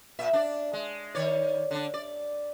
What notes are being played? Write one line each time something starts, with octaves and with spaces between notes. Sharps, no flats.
A#2 E5
D4 D5
G#3
D#3 C#5 D5
D3 D4
D5